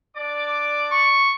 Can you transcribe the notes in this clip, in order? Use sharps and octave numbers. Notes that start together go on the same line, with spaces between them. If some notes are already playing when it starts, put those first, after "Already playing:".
D4 D5 D6
C#6